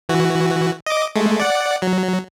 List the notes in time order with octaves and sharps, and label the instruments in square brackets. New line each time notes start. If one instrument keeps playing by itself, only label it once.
[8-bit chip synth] E3 F#4
D#5 D6
G#3 A3
D5 F#5
F#3